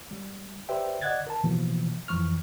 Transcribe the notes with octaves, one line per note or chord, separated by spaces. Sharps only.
G3
G4 B4 C5 D5 E5 G5
D5 D#5 F#5 F#6 G#6 A6
A#4 A5
B2 E3 F3 A#3
F2 E3 F3 C#6 F6